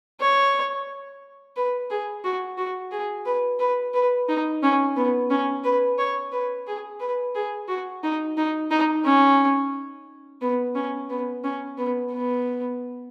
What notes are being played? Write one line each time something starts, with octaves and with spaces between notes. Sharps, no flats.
C#5
B4
G#4
F#4
F#4
G#4
B4
B4
B4
D#4
C#4
B3
C#4
B4
C#5
B4
G#4
B4
G#4
F#4
D#4
D#4
D#4
C#4
B3
C#4
B3
C#4
B3
B3